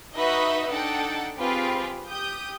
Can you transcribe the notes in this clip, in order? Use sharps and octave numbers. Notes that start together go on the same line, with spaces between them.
D#4 F#4 B4 D#5 E5
D4 D#4 A4 F#5 G5 A5
C4 F4 G4 G#4 B4
G4 D#6 G6